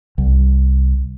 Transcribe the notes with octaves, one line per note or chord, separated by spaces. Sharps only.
C2